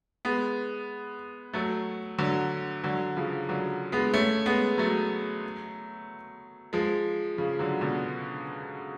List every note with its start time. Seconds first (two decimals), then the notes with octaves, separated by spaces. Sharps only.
0.25 G#3 B3
1.54 F#3 A3
2.19 D3 F#3
2.84 D3 F#3
3.17 C#3 F3
3.49 D3 F#3
3.92 G#3 B3
4.14 A3 C#4
4.46 G#3 B3
4.78 F#3 A3
6.73 F3 G#3
7.38 C#3 F3
7.59 D3 F#3
7.81 B2 D3